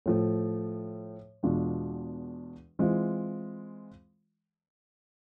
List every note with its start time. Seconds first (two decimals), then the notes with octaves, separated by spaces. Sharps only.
0.06 A2 F3 A3
1.43 E2 B2 G#3 D4 F4
2.79 E3 G#3 C4 F4